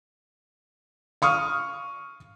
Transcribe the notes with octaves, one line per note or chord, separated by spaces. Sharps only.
F5 C#6 D#6 F6